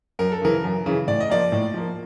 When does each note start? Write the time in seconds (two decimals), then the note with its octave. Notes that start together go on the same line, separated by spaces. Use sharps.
0.19 F#2 A#4
0.32 A4
0.42 C#3 E3 A#4
0.64 F#2
0.86 C#3 E3
1.07 A2 D5
1.20 D#5
1.30 F3 A#3 D5
1.52 A2
1.74 F3 A#3